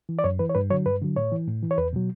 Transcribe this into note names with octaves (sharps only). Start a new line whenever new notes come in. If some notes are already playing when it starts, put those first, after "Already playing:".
E3
D5
F#2 C#5
E3 B4
C#5
G2 B4
D3 F#3 C#5
G2 B4
D3 F#3
A2 C#5
E3
A2
E3
C#5
E2 B4
B2 F#3